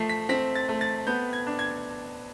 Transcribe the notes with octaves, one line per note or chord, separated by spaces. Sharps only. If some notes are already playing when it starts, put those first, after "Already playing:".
Already playing: F3 A3 C7
B6
C4 B6
A6
A3
A6
B3 G6
G#6
D4
G#6